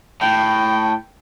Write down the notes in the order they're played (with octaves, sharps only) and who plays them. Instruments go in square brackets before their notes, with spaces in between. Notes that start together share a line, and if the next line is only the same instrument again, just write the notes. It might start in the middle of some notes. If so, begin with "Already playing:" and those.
[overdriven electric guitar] A2 [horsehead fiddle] G5